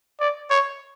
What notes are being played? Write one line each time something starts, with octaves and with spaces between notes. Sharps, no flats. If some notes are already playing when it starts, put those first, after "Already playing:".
D5
C#5